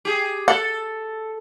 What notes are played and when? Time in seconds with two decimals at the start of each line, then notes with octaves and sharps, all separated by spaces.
0.05 G4 G#4
0.48 A4 F#5